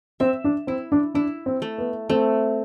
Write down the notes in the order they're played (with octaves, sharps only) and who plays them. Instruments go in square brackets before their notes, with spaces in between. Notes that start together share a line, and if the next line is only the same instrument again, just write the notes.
[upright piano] C4 [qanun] E5
[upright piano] D4
[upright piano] C4 [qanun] E4
[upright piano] D4
[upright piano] D4 [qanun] E4
[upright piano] C4
[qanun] A3
[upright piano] B3
[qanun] A3 [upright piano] C4